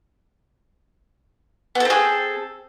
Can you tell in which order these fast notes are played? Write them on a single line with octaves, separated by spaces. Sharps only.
B3 A4 C4 G#4